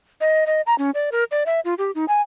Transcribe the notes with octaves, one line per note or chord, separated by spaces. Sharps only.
D#5
D#5
A#5
C#4
D5
A#4
D5
E5
F4
G4
D#4
G#5